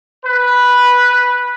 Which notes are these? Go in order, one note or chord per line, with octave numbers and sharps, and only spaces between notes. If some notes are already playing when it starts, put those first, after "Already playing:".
B4